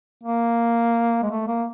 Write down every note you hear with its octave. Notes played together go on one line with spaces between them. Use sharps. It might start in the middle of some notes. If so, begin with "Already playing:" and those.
A#3
G#3
A3
A#3